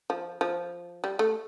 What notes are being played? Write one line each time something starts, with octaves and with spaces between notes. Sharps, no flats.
F3
F3
G3
A3